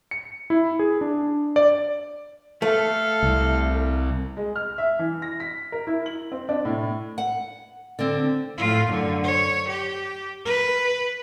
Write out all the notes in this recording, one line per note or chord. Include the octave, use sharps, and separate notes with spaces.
C#7
E4
G#4
D4
D5
A3 A4 F5
C2
G#3
F6
E5
E3
A#6
B6
A#4
E4
F#7
C4
D4
A2
F#5
D3 C4
A2 F4
F#2 D3
C#5
G4
B4